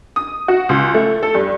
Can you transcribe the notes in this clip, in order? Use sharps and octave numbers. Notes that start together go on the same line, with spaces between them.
D#6
F#4
C#2
A3
A4
G2